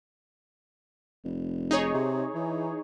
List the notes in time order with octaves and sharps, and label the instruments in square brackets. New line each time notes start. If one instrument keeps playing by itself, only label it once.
[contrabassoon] F1
[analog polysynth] D#4 G#4 C#5
[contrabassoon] C3
E3